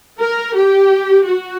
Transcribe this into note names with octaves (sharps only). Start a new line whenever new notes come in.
A#4
G4
F#4